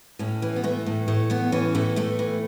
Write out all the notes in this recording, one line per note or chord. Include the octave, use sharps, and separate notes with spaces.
A2 C#4
E3
B3
E3 A3
A2
A2 A3
E3 B3
E3 C#4
A2 A3
A2 A3
E3